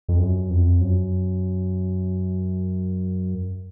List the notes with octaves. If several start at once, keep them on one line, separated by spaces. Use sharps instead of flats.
F2
F#2
F2
F#2